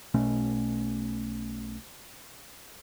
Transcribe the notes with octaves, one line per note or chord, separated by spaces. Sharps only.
B1 B2 A3 C#4